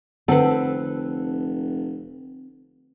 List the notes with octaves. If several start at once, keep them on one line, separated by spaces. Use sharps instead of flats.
F1 D3 C4 A4 B4 F#5